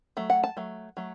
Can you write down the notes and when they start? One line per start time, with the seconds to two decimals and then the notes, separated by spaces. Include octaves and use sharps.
0.17 F#3 A3
0.30 F#5
0.44 A5
0.57 F#3 A3
0.97 F#3 A3